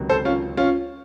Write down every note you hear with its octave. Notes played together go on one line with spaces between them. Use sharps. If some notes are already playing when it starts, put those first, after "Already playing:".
Already playing: C#2 C3 D#3 F#3
A4 C5
C#4 F4
C#4 F4